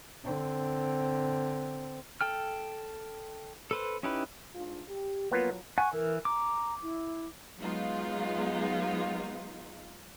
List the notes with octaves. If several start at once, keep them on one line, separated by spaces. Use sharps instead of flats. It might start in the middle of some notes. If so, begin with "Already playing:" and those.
D3 C4
A4 G5 F6
A4 B4 C5
C#4 D#4 E4 G4 B4
G#2 D4 F4
G4
F3 F#3 A#3 B3 F4
F#5 G#5 C#6
E3 A#4
A#5 D6
E4
F#3 G#3 B3 D#4 F4